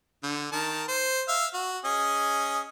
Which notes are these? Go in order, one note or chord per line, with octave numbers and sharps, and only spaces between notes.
D3
D#3 A#4 A5
C5
E5 F5
F#4
C#4 G#4 D#5